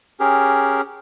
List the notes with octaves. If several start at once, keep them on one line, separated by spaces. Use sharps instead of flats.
C#4 G4 G#4 A#4